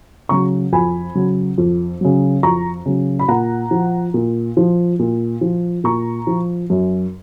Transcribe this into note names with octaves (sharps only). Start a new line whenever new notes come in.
C#3 F#3 A#5 C#6
F2 G#5 B5
C#3 F#3
F2
C#3 F#3
F2 A#5 C#6
C#3 F#3
B5
A#2 F#5 A#5
F3
A#2
F3
A#2
F3
A#2 A#5 C#6
F3
F#2